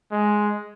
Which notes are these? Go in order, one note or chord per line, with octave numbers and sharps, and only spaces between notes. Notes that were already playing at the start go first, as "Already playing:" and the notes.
G#3